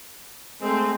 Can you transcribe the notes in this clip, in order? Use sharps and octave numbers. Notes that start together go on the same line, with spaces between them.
G#3 A3 C4